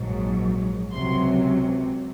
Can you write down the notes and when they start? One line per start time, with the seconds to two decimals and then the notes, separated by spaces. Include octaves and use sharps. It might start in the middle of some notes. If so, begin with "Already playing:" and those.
Already playing: A#1 G#2 F#3
0.92 C#2 C3 F#3 C6